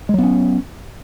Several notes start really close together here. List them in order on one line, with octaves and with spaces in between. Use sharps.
G#3 F#3 B3 C#4